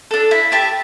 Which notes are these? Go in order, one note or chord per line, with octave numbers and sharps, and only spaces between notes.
D4 A4
E4
G4 E5 A5